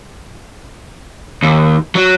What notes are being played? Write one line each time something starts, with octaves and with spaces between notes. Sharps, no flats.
D#2
F#3